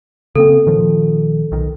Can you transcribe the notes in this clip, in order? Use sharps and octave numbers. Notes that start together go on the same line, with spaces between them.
C#3 A#3 C4 A4
A#2 D#3 F3
B1 D#3